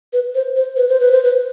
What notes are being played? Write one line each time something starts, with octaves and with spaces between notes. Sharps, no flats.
B4
C5
C5
B4
C5
B4
C5
B4